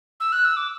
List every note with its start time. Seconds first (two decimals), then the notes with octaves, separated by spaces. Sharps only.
0.20 E6
0.32 F#6
0.44 E6
0.57 D6